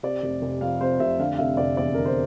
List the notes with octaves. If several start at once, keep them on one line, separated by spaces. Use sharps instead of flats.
C3 D5
F1
F1
F2 F5
C3 C5
F1 E5
D3 F5
F5
F1 E5
F1 D5
E2 D5
D3 A#4
C5